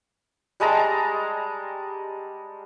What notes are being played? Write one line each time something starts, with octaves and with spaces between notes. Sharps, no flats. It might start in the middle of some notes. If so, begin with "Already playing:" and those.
G3 G#3 A5 A#5